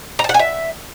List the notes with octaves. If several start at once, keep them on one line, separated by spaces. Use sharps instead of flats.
A#5
A5
F#5
G#5
E5